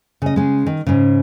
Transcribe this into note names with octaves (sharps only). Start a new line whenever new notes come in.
C#3 D#5
C#3 G#3
D#3
G#2 C#3